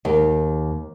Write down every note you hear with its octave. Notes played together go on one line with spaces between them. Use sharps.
D#2